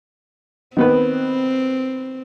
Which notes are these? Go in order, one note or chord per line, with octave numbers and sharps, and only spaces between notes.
D#3 B3 C4 B4